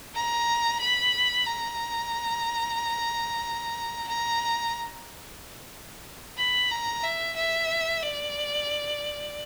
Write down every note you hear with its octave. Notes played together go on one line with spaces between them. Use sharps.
A#5
B5
A#5
A#5
B5
A#5
E5
E5
D5